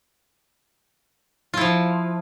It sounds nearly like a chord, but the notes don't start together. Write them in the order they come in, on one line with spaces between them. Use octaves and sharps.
F4 E4 F3